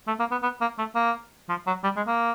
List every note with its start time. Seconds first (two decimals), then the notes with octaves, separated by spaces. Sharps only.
0.07 A3
0.20 A#3
0.31 B3
0.43 B3
0.61 A#3
0.78 A3
0.96 A#3
1.49 F3
1.67 F#3
1.84 G3
1.96 G#3
2.07 A#3